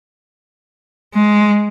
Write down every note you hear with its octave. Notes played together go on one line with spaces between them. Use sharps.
G#3